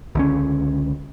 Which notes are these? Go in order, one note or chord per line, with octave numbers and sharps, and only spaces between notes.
C#2 D3 C#4